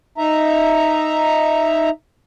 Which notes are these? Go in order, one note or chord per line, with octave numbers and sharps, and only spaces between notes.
D#4 E5 A#5